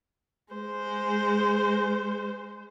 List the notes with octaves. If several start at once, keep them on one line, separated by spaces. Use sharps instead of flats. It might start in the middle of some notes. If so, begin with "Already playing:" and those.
G#3 C5